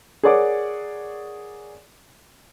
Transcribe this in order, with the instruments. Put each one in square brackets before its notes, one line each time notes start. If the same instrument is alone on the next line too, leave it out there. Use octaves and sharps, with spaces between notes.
[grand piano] G#4 A#4 C#5 D5 F#5 D6